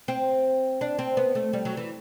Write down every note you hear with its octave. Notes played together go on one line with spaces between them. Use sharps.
C4
D4
C4
B3
A3
G3
F#3
E3